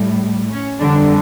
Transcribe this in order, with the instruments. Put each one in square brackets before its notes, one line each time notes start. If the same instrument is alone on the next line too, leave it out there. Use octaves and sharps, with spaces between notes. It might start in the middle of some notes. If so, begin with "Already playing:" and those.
Already playing: [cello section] A2 G3
C#4
F2 D3 G3 D4